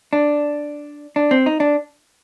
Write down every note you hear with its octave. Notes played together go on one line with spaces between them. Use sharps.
D4
D4
C4
D#4
D4